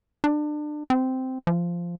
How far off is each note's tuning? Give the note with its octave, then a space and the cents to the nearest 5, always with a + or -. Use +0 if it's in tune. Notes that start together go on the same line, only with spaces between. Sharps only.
D4 +30
C4 -10
F3 -10